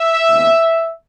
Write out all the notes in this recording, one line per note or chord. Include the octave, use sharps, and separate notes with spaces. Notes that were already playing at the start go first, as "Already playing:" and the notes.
Already playing: E5
D#2 C#3 G#3 B3